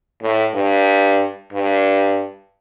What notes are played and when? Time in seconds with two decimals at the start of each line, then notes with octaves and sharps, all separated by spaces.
0.22 A2
0.54 G2
1.52 G2